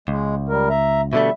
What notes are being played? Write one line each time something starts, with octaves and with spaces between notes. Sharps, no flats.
C#2 G#3
G3 A#4
E5 A#5
B2 D3 G3 A3 E5